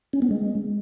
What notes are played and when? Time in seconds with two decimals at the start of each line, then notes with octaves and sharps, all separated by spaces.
0.13 C#4
0.22 B3
0.31 G#3